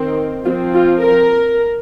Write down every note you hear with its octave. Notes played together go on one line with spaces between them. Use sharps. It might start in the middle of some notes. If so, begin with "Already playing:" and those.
Already playing: D#3 C4
F3 C4 F4
F4
A#4